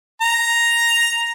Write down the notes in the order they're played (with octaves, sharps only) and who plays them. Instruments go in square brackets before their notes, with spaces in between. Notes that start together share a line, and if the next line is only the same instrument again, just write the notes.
[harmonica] A#5